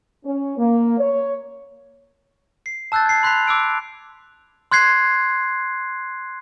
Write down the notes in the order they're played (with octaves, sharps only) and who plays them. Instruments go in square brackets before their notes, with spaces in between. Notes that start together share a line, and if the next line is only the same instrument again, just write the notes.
[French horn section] C#4
A#3
C#5
[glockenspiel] C7
A5 E6 F#6 G6 A6
G#6 C7
B5 C6 F#6 B6 C7 F7
D6 E6 D7
C6 F#6 G#6 C7